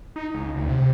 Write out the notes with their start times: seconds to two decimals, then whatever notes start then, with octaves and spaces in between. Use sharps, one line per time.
0.16 D#4
0.34 C#2
0.56 D2
0.69 C3